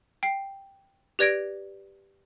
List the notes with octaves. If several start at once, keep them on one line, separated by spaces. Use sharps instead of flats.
G5 C7
G4 B4 D5 G#6 A#6 D7